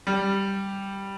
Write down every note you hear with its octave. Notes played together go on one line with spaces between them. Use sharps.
G3